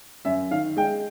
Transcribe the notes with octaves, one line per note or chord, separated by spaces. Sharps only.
F#2 E5
D#3 F5
G#3 G5